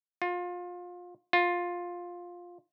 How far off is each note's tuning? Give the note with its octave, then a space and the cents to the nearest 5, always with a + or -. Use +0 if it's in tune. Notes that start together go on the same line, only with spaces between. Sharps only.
F4 +25
F4 +10